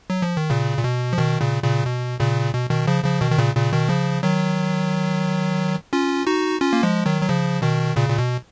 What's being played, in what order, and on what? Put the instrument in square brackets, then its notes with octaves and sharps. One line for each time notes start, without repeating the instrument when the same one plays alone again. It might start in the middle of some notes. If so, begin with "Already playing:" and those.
[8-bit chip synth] F#3
F3
D#3
A#2 C#3
A#2
B2
F3
B2 D#3
A#2 C#3
A#2 C#3
B2
A#2 C#3
B2
B2 D#3
C#3 F3
C#3 F3
B2 D#3
D#3
A#2 C#3
A#2 C#3
B2 D#3
C#3 F3
D#3 F#3
C#4 F4
D#4 F#4
C#4 F4
A#3
F3 G#3
D#3 F#3
F#3
C#3 F3
B2 D#3
A#2 C#3
A#2
B2